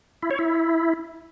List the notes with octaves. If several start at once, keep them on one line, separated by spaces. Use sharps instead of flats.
E4
C#5
E4